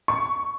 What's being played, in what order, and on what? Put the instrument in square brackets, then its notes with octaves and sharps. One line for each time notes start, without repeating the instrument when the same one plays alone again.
[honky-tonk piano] C#6